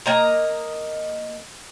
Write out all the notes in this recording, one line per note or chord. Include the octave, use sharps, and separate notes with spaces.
A#3 D#5 A#5